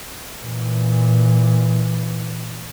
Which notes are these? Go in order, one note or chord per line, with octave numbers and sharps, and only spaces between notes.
A#2 E3